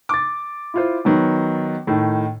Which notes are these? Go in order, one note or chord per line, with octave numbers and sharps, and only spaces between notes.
D6 A6
E4 F4 C5
D#3 F#3 B3
A2 D#3